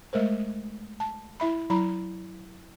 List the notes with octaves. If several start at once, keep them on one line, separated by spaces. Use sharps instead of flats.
G#3 A3 A#4 C5
A5
E4 E5 B5
F#3 E4 A#5 B5